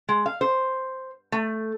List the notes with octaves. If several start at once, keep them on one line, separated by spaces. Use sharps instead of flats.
G#3
F5
C5
A3